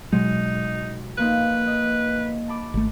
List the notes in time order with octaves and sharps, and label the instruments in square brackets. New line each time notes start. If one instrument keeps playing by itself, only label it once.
[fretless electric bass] B2 F#3 G#3 [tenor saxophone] D#4 [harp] F#4
[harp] F3 A#3 D#4 [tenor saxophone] B4
[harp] D#5
A5 B5 D6
[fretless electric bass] G#1 A3